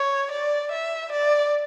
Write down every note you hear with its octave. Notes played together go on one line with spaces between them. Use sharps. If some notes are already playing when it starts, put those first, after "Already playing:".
Already playing: C#5
D5
E5
D5